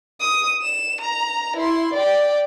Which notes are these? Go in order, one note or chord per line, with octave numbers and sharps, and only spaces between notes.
D#6
E7
A#5
E4 C6
D5 G5